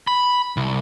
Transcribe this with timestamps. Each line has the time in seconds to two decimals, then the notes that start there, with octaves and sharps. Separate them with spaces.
0.07 B5
0.57 C2